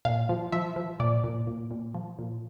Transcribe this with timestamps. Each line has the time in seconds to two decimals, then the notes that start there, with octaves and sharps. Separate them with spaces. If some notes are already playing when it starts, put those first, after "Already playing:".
0.05 A#2 F5
0.29 F3
0.52 F3 E5
0.76 F3
1.00 A#2 D5
1.24 A#2
1.47 A#2
1.71 A#2
1.95 F3
2.19 A#2